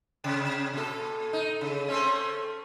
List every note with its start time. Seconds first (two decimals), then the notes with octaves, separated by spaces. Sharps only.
0.24 C3
0.73 A#2 A4
1.33 D#4
1.61 C#3
1.88 A3 C4 C#4